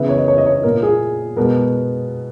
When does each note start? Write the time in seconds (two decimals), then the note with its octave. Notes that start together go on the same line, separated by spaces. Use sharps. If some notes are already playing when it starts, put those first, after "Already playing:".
Already playing: C#3 E3 B3 E5
0.09 C#5
0.18 D#5
0.28 C#5
0.38 D#5
0.46 C#5
0.63 A#2 A#3 A#4
0.83 G#4
1.36 B2 G#3 B3 A#4